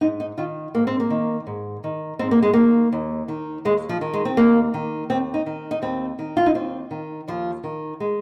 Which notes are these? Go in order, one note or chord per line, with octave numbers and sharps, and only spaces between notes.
G#2 D#4
D#4
D#3 F4
G#2 A#3
C4
A#3
D#3
G#2
D#3
G#2 C4
A#3
G#3
D#3 A#3
D#2
D#3
D#2 G#3
F3
D#3
G#3
C4
D#2 A#3
D#3
D#2 C4
D#4
D#3
D#4
D#2 C4
D#3
F4
D#4
D#2 C4
D#3
D#2 F3
D#3
G#3